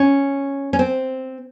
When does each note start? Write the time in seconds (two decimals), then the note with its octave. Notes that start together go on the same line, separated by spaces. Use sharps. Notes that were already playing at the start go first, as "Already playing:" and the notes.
Already playing: C#4
0.73 C#4
0.79 C4